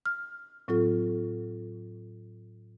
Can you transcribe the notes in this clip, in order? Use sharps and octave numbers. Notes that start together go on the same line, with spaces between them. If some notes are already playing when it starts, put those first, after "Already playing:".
F6
A2 F#3 C4 F4 A4